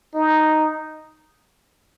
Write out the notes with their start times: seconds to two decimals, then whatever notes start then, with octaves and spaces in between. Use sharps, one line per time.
0.14 D#4